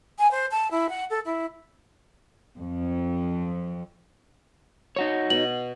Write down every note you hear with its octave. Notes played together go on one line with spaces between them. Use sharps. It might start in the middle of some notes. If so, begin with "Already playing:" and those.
G#5
C5
A5
E4
F#5
A4
E4
F2
D#4 F#4 C#5
B2 F#7